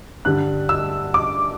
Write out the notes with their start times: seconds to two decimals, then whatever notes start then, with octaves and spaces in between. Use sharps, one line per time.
0.25 G2 D3 G3 F#6
0.69 E6
1.14 D6